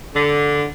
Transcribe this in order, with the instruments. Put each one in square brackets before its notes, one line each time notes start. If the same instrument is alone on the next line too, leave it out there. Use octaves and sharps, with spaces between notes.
[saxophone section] D3